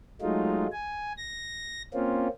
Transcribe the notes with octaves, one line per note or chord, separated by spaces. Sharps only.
F#3 G#3 A3 D#4 F4
G#5
A#6
A#3 C4 C#4 F4